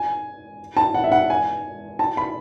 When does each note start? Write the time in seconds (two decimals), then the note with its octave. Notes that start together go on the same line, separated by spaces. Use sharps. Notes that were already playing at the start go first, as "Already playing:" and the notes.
Already playing: G#5
0.77 A5
0.94 F#5
1.04 E5
1.12 F#5
1.30 G#5
1.99 A5
2.17 B5